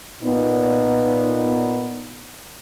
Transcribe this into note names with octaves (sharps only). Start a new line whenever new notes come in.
A#2 B3 D#4